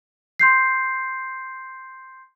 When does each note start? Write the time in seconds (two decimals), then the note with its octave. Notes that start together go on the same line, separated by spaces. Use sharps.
0.40 C6 G6 C7